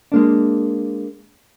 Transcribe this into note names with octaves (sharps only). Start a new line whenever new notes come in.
G#3 A#3 D4